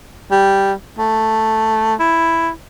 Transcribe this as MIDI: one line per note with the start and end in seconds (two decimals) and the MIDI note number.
0.31 0.73 55
0.99 1.95 57
2.00 2.50 64